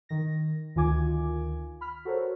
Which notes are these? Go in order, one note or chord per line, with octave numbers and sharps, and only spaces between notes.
D#3 A#6
D2 D#3 F4 G#5 D6 G#6
B5 F6 B6
F#4 A4 A#4 C5 C#5